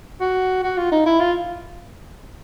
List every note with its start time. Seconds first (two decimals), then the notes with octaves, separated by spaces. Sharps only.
0.20 F#4
0.63 F#4
0.78 F4
0.92 D#4
1.06 E4
1.20 F4